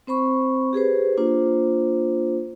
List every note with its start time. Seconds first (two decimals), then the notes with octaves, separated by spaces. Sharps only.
0.07 C4 C5 B5 C#6
0.73 G4 G#4 B4 C5
1.17 A#3 D4 F4 C5